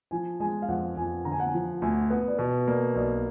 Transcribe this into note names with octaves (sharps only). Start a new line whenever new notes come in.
F3 G#5
G#3 G#5
F5
F2 F#5
F2 G#5
D3 A#5
G#5
F#5
G#5
F3
D2 G#5
B3 F#5
D5
B2 B4
A#3 D5
B1 D5